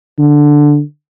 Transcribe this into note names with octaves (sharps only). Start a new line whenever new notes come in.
D3